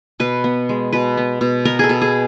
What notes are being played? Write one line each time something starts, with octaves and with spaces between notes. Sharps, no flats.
B2 B4
B3
G#3
B2 B4
B3
B2
B3 A#4
G#4 A4
B2
G#4